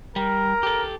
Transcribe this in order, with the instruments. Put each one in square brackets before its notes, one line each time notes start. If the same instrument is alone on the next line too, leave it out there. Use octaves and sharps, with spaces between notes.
[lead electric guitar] G3 [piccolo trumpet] A#4
[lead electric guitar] G4 A4